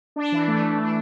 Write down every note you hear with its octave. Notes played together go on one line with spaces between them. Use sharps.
D4
E3
A3
E3
D4